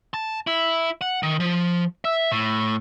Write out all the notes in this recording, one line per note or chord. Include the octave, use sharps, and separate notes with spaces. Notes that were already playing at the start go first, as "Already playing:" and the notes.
A5
E4
F#5
D#3
F3
E5
A2